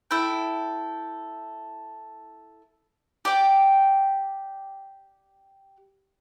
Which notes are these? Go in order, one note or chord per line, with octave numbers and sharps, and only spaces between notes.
E4 A4 G5
G4 D5 G5